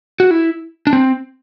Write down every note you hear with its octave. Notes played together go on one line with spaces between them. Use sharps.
F#4
E4
D4
C4